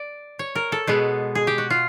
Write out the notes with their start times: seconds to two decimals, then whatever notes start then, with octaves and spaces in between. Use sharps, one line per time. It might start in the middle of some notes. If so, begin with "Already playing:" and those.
Already playing: D5
0.39 C#5
0.55 A#4
0.72 A4
0.87 B2 G#3 B3
1.35 G#4
1.47 G4
1.58 F#4
1.70 F4